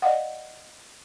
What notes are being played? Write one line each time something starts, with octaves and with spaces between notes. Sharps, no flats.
D5 D#5 F5 F#5